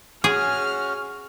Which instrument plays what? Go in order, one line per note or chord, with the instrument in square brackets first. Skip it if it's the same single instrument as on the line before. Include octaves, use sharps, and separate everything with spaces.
[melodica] C#4 F#4 [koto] G#4 [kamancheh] F6